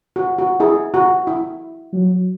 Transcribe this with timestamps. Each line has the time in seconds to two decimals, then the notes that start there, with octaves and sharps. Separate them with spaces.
0.16 F#4
0.38 F#4
0.60 E4 G#4
0.94 F#4
1.27 E4
1.93 F#3